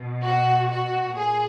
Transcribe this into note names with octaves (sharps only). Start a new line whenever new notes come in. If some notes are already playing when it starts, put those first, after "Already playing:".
Already playing: B2
F#4
F#4
A#2 G#4